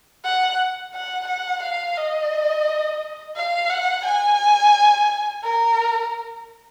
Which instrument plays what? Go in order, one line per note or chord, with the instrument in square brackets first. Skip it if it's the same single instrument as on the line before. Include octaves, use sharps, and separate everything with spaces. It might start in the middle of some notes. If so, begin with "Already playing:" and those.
[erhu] F#5
F#5
F#5
F5
D#5
F5
F#5
G#5
A#4